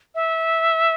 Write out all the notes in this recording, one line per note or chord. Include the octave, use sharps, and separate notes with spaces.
E5